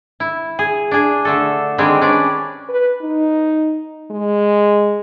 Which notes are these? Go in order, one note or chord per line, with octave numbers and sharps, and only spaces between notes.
E4
G#4
D4 G#4
D3 A3 A4
D#3 G3 G#3 C4 D4 G#4
C#4 D4 B4 D5
B4
D#4
G#3